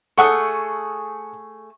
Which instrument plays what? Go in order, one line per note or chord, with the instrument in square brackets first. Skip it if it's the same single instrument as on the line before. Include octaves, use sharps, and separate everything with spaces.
[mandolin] A3 G#4 C#6 [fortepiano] A4 F#5 D#6